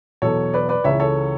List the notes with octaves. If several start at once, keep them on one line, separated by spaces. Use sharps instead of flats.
E2 B2 F#3 A4 C#5
B4 D5
B4 D5
C#2 C#3 E3 C#5 E5
A4 C#5